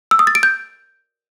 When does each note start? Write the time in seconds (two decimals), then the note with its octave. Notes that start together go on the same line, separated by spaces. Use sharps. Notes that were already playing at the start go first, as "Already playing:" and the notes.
0.11 E6
0.19 D#6
0.27 A6
0.35 D7
0.43 G6